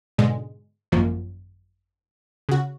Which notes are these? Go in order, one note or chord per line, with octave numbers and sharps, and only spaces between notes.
G#2 B2 D3 G#3
G#1 F#2 F3 A#3
C#3 F#4